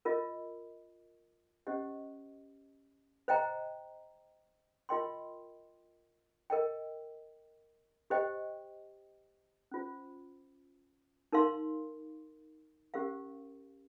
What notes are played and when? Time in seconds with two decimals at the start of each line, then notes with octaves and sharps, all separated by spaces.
0.05 F4 A#4 D#5
1.67 C#4 G4 C5 D#5
3.28 C5 D#5 G5 A#5
4.89 F4 A#4 D#5 G5 C6
6.50 A#4 D#5 G5
8.10 G4 C5 D#5 G5
9.71 C#4 F4 C5
11.32 D#4 A#4 F5 C6
12.94 C#4 G4 A#4 F5